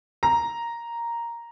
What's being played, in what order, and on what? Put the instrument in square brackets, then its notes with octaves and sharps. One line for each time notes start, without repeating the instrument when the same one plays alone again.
[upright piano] A#5